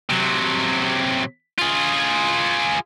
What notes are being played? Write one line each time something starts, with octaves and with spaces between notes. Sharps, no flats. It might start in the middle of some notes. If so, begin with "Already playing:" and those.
C3 F#3
F4 G#4